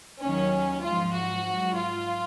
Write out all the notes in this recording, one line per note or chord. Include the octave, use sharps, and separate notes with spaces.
D#2 D#3 F#3 C#4
G#2 F3 F4
F#4
G#2 F#3
F4